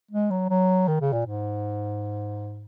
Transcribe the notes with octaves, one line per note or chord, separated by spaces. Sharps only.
G#3
F#3
F#3
D#3
C#3
A#2
G#2